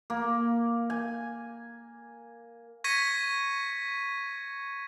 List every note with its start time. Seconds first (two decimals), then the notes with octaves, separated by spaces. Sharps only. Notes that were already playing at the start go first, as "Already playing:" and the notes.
0.10 A#3
0.90 G#5
2.84 C#6 G#6 A#6 B6 C#7 D#7